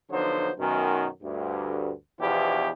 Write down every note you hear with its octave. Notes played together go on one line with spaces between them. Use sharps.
D3 F3 F#3 B3 D#4 C5
F#2 B2 D#3
D2 G2
E2 B2 F3 D4 E4 G4